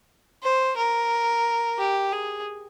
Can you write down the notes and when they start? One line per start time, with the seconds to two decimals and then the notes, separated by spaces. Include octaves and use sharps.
0.43 C5
0.77 A#4
1.78 G4
2.12 G#4